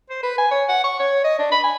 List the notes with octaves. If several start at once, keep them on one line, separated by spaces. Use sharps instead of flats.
C5
B4
G#5
C#5
F#5
C#6
C#5
D#5
D4
B5
G#5